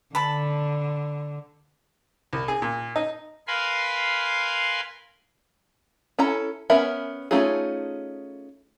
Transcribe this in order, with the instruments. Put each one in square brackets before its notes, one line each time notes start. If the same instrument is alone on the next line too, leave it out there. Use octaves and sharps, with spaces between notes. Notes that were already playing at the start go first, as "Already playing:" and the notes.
[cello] D3 [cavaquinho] A5 B5
[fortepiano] C2
G#4
A#2
D#4
[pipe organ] A#4 B4 F5 G#5 B5 C6
[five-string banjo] C#4 E4 A4 A#5
B3 C#4 A#4 E5 B5
A3 C#4 D#4 F4 G#4